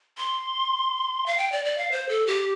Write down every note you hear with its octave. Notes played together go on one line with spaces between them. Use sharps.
C6
F5
G5
D5
D5
F5
C5
A4
G4